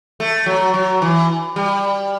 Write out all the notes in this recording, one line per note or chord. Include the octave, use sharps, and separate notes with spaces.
A3
F#3
F#3
E3
G3